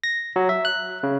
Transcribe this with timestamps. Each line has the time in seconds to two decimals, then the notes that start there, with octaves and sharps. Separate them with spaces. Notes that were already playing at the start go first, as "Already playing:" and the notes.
0.04 A#6
0.36 F#3
0.49 E5
0.65 F#6
1.03 C#3